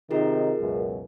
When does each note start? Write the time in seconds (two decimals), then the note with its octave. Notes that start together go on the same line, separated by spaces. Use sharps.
0.11 C3 D#3 D#4 F4 G#4 A#4
0.60 C#2 F#2 B2